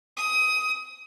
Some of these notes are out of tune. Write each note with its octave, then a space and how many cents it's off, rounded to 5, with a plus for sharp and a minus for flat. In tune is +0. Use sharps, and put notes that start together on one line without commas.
D#6 +20